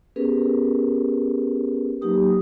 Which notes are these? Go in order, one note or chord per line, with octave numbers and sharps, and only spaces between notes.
B3 C#4 G4 G#4 A#4 B4
F#3 A#3 D#4 G4 D#6